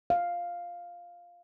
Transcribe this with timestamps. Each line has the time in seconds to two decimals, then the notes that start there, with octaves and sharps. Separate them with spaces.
0.10 F5